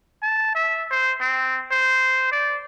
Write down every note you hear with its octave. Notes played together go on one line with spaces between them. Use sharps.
A5
E5
C5
C4
C5
D5